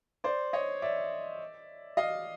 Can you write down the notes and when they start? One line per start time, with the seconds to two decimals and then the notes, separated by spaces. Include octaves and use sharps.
0.24 C5 D5
0.53 C#5 D#5
0.82 D5 E5
1.97 D#5 F5